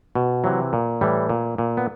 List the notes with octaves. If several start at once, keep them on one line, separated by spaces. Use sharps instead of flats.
B2
C3 E3 F#3
A#2
A2 E3 G3
A#2
A#2
B3